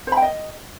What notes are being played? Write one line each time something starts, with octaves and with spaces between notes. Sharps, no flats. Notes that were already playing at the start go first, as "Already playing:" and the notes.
C5
B5
G5
D#5